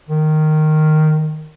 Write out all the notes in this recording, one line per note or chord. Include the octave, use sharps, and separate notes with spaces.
D#3